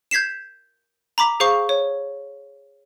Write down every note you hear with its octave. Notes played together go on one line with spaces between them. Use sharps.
G6 G#6 B6 C7 E7
A#5 B5 D6 B6
G#4 C5 F5 C#6
C#5